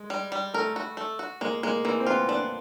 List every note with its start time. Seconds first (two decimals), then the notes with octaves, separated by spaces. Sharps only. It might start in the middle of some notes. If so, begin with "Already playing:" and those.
Already playing: G#3
0.10 G3
0.32 G3
0.54 A3 A#4
0.76 F#4
0.97 A3
1.19 F#4
1.41 G#3 A#3
1.63 G#3 A#3
1.85 E3 A#3
2.00 C4
2.07 B3 F4
2.29 B3 D4